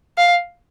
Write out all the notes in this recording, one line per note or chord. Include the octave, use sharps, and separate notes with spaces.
F5